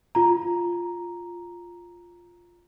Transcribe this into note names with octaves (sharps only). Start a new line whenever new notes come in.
F4 A#5